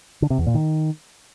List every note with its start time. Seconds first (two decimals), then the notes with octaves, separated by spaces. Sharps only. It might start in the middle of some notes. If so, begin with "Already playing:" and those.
0.22 D3
0.30 C3
0.38 E2
0.46 A#2
0.55 D#3